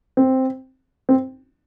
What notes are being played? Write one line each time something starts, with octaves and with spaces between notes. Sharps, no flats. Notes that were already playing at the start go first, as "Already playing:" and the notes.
C4
C4